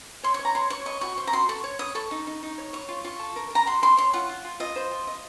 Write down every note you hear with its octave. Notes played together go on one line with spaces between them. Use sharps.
C#5 C6
C#6
C#5
A#5
C#5 C6
C#5 C#6
D#5 C#6
F#4 C#6
C5 C#6
A#5
F#4 C6
A4 C#6
C#5
C#5 D#6
A4 C#6
D#4
D#4
D#4
C#5
C#5 C#6
F4
F4 C#6
A4
A#4
A#4 A#5
F#4 C6
A#4 C6
C#5 C6
F4 F#5
F4
F4
F4 D#5
C5
F4
D#5